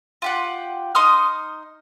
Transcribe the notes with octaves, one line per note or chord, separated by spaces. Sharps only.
F4 G4 F#5
D#4 C6 D#6 F6